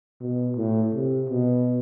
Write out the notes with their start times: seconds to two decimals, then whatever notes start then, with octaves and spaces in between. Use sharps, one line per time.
0.20 B2
0.57 A2
0.94 C3
1.29 B2